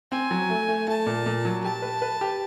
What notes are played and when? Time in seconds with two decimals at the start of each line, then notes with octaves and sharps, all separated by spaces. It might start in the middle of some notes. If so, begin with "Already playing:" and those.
0.12 C4 G#5
0.31 F#3
0.50 A3
0.68 A3
0.88 A3 A5
1.06 A#2
1.26 A#2
1.45 F#3
1.64 G4 A5
1.82 B4
2.02 B4
2.21 G4